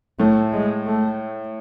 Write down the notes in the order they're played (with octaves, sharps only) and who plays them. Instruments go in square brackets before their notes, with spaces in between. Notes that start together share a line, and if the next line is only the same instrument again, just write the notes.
[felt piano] A2 [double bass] A3
[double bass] G#3
A3